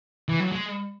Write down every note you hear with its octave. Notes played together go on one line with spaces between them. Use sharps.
E3
F#3
G#3